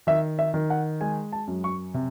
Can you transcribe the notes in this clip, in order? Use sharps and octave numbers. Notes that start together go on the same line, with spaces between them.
D#3 E5
E5
D#3
F#5
G#3 G#5
A5
F#2
C#6
C3